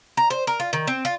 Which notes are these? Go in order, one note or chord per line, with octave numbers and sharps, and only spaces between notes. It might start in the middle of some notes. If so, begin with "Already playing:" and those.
A#5
C5
A#4
F4
D#3
C4
F4